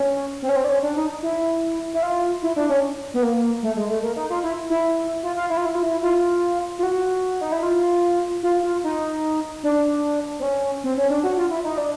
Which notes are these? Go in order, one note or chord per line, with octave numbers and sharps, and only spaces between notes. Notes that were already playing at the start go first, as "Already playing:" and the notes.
Already playing: C#4
C4
C#4
C4
D4
C#4
D4
D#4
E4
E4
F4
E4
D4
C#4
B3
A#3
A3
G#3
A3
A#3
D#4
F4
E4
E4
F4
F4
E4
F4
E4
F4
E4
F4
F4
F#4
D#4
E4
F4
F4
F4
D#4
D4
C4
C#4
C4
C#4
D4
F#4
F4
E4
D#4
D4